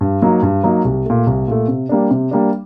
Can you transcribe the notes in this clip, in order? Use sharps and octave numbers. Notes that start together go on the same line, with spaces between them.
G2
F#3 A#3 D#4
G2
F#3 A#3 D#4
C2
A#2 A3
C2
A#2 A3
C3
G3 A#3 D4
C3
G3 A#3 D4